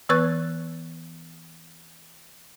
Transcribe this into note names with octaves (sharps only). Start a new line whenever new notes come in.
E3 B3 B4 C#6 F#6 G#6